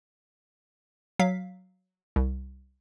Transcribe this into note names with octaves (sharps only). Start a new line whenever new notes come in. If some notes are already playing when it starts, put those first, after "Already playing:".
F#3 F5 B6
C2